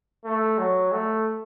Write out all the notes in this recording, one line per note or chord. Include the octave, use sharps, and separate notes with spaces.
A3
F#3
A3